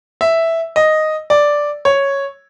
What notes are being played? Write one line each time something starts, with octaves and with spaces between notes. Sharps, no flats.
E5
D#5
D5
C#5